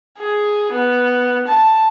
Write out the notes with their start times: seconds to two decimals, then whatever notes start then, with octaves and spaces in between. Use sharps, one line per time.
0.19 G#4
0.72 B3
1.47 A5